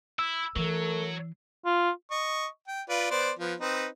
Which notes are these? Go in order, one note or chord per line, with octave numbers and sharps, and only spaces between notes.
E4 E6
E3 F#3 A3 A4 A#4
F4
D#5 C#6
G5
F4 B4 D5
B3 C5 D5
F3 B3
C4 D#4 B4